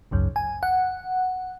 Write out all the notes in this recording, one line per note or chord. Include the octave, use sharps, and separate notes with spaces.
G#1 C#2 F#2
G#5
F#5